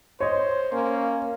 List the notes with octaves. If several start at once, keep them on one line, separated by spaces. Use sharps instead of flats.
C5 C#5 D#5
A#3 C#4